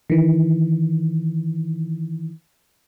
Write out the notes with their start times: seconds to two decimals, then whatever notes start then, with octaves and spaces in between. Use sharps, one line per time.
0.10 D#3 E3